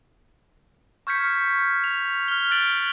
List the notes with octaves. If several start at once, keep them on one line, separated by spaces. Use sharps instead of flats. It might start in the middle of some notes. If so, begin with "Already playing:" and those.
C#6 F6 G6 G#6 B6 C#7
F7
F6 G7
F6 F#6 A6 D7 F#7 G7